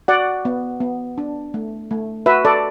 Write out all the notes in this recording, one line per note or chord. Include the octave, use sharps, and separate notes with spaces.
F#4 D5 F#5
B3
B3
D4
A3
A3
F#4 B4 E5
A4 D5